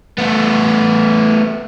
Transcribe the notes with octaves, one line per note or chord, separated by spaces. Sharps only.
A3 B3